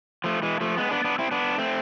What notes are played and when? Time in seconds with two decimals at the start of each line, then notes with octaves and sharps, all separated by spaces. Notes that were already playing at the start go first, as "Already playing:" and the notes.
0.24 F3 A3
0.43 E3 G#3
0.61 F3 A3
0.77 G#3 B3
0.91 B3 D4
1.05 B3 D4
1.19 C4 E4
1.31 B3 D4
1.58 A3 C4